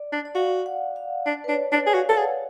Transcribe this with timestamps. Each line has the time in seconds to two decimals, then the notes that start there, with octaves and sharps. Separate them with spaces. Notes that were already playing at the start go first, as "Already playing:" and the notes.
Already playing: D5
0.13 D4
0.25 D5
0.35 F#4 F5
0.66 F#5
0.96 F5
1.26 D4 D5
1.44 B4
1.48 D4 C#5
1.72 D4 D5
1.86 G#4
1.94 F#4 F5
2.09 A4
2.17 G#4 F#5